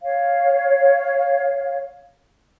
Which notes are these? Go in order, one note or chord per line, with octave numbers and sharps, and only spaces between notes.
C#5 F5